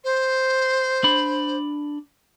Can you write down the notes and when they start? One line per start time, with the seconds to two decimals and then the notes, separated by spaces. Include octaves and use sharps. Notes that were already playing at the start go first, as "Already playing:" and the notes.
0.04 C5
1.04 D4 B5